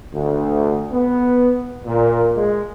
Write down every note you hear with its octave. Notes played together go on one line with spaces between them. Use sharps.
D2
B3
A#2
G#3